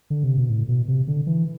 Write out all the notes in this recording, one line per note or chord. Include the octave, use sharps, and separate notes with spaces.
D3
C3
B2
A2
B2
C3
D3
E3